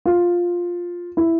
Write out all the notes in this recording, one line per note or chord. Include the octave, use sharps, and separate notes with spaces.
F4
E4